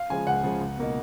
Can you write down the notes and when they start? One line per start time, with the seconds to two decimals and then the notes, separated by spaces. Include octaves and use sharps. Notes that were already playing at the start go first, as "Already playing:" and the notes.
Already playing: F5
0.10 C#3 F3 G#3 G#5
0.27 C#2 F#5
0.43 C#3 F3 G#3
0.61 C#2
0.78 B2 A#3 D#4